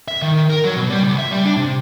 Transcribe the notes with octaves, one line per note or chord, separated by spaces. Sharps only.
E5
D#3
A#4
F#3
B2
G3
C#2
E5
G3
D4
C3